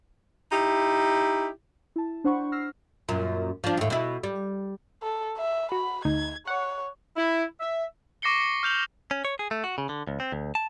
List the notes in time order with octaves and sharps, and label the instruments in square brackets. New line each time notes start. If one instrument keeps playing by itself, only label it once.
[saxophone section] D#4 E4 G4
[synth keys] E4 A5
D4 C5 F#5 B5 C#6
E6 F6 A#6 C7
[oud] F#2 A#2
F3 D4
D#2 A2
B2 E4
G3
[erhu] A4
E5
[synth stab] F#4 [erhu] B5
[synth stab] D2 D#4 [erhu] G#6
[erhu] C#5 [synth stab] F#5
[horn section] E4
E5
[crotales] C#6 D6 A#6 C7 C#7 G7
C#7
F6 G6 F7 F#7
[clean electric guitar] C#4
C#5
G#4
A3
F#4
C#3
D3
C#2
C4
D2
A5